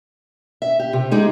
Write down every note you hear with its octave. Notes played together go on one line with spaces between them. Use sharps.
E5
G4
C3
G#3 D#4 G4 G#4